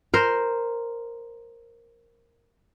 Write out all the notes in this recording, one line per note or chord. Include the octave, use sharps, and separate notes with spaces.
A#4 C5